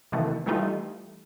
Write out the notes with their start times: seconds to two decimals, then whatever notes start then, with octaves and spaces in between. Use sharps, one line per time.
0.12 C3 D#3 E3 A3 A#3
0.46 E3 G3 A3 D#4 F4 G4